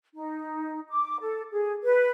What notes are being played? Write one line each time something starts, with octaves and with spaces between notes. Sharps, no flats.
D#4
D6
A4
G#4
B4